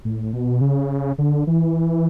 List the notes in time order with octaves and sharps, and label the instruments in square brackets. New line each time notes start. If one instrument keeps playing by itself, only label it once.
[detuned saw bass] A2
B2
C#3
D3
E3